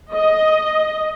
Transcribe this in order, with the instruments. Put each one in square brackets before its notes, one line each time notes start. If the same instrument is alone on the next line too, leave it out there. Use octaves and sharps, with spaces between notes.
[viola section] D#5